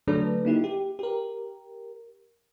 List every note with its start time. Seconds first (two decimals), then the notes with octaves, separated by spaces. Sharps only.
0.07 D3 F#3 A3 D4 A4 B4
0.45 A#3 D#4 E4 G4
0.64 G4
0.99 G4 A#4